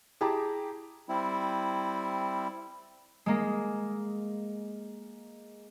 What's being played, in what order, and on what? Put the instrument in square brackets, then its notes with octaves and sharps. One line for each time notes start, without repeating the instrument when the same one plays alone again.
[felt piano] E4 G4 G#4 A5 A#5 D6
[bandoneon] G3 C4 E4
[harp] G#3 A#3